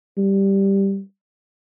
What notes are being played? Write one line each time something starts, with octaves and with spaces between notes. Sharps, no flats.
G3